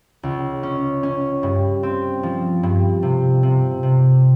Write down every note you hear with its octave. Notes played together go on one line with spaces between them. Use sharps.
C#2
C#4
C#4
G2
C4
F3
G2
C3
C3
C3